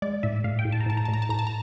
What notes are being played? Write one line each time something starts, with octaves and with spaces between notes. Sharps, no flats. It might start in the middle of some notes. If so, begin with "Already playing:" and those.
G#3 D5
A2 E5
A2 F5
G5
A2
A5
A#5
A2 A5
A#5
A2 A5
A#5
A5
A2 A#5
A5
A#5